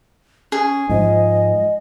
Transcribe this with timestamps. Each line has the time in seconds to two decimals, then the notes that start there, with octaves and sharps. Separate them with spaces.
0.52 C#4 G#4
0.89 G#2 F3 D#5